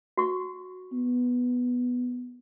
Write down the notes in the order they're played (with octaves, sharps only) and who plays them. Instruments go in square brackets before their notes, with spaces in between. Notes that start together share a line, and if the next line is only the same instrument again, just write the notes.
[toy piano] F#4 C#6
[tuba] B3